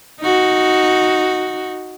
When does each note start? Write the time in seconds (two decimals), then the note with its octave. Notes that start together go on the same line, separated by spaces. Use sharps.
0.21 D#4 F#4